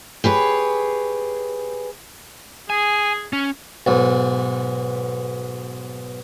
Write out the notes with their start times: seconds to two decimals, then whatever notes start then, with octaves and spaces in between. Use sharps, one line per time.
0.24 G4 G#4 B4 C#5
2.70 G#4 G#5
3.33 C#4
3.86 B1 G#2